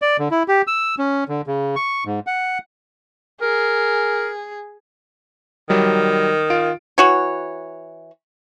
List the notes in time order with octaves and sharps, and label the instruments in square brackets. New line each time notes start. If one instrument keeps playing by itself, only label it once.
[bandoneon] D5
D3
E4
G4
E6
C#4
D3
C#3
C#6
G#2
F#5
[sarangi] G#4 [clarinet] A#4
[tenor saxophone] D#3 [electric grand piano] F#3 G3
[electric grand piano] F4 D7
[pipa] E3 F#4 C#5